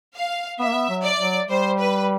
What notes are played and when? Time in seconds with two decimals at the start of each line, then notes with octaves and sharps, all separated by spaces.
0.15 F5
0.59 B3 E5
0.67 A#3
0.74 B3
0.89 F#3
1.04 D5
1.20 F#3
1.49 G3 C5
1.79 B4